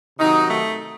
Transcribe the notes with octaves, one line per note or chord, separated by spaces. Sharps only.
C3 D#3 F#3 D#4
A3